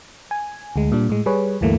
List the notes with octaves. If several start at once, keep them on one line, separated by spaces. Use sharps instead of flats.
G#5
D2 G#3
A#2 G3 D4
A2 G#3
G3 G#4 B4 C#5
D2 G2 E3 A3 A#3